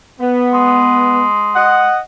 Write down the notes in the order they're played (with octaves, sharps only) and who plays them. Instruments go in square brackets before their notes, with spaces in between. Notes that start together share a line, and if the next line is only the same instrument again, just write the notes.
[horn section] B3
[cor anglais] G#3
[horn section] D#5 F#5